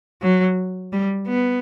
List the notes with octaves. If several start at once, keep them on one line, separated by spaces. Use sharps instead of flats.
F#3
G3
B3